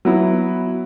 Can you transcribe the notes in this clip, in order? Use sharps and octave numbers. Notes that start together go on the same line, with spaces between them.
F#3 B3 E4